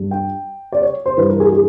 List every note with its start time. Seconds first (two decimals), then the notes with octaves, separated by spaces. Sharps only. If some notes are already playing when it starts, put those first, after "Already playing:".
Already playing: G2
0.11 G5
0.72 D5
0.82 C#5
1.06 C5
1.17 G2 E3 B4
1.29 A#4
1.40 G#4
1.53 G#4